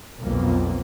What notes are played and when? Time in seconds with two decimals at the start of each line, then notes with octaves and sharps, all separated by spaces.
0.22 B1 F2 A#3 B3